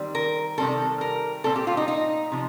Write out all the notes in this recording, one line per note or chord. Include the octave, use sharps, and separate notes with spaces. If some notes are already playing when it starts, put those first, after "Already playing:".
Already playing: D#3 G3 C4
A#4
C3 D#3 G3 C4 A4
A#4
A#2 G3 C4 A4
G4
F4
D#4
D#4
C3 F3